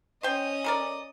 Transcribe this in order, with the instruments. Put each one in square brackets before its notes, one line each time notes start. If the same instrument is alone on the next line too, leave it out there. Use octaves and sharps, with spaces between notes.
[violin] C#4 [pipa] C5 G5 [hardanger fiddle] D#5
[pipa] A4 A#4 D5